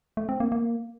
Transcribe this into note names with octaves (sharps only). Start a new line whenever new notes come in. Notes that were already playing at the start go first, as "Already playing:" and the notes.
A3
C4
A#3
A#3